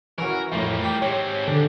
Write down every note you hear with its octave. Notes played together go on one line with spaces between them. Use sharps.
E3 C#4 F#4 A#4
F2 A2 G3 A#3
G5 D6
G#2 C4 G4 C#5
D3 D4